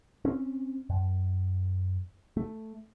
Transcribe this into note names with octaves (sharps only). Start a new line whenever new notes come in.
C4 C#4
F#2
A3